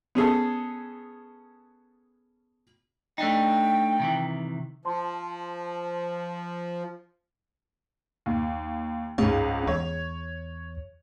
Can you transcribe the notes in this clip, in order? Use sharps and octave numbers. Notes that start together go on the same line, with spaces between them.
B3 C#4 G#4 A4
A3 D4 D#4 G5
C3 D#3 E3
F3 C5 A5 C6
D#2
C#2 G#2 C#4
E2 C#5